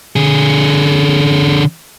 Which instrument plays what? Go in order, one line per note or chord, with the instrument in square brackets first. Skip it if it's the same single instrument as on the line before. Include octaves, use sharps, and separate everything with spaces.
[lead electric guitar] D3 G#4